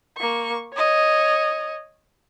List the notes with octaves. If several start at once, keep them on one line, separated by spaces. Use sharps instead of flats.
A#3 C#6
C#5 D#5